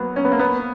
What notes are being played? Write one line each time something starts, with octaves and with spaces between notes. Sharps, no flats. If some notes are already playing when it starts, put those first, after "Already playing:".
Already playing: F#3 A#3 B3
C#4
B3
A#3
B3